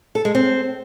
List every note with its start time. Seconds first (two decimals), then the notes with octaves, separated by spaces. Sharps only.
0.15 A4
0.25 G#3
0.35 C4